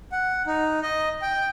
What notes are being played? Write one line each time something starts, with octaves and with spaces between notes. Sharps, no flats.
F#5
D#4
D#5
G5